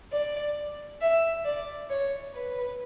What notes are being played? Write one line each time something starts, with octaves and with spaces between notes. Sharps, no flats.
D5
E5
D5
C#5
B4